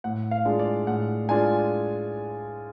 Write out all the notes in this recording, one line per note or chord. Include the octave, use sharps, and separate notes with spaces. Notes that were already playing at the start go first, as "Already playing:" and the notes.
A2 F#5
F5
G#3 D4 F4
D5
A2 F#5
G#3 D4 F4 G#5